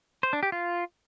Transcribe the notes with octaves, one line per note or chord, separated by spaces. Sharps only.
C5
D4
G4
F4